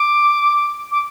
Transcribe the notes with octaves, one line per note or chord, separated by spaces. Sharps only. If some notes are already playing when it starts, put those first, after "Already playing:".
Already playing: D6
D6